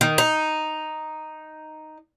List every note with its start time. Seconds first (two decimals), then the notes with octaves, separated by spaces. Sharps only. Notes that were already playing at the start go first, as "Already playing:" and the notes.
0.01 D#3
0.18 D#4